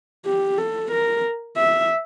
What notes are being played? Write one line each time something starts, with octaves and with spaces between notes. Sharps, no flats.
G4
A4
A#4
E5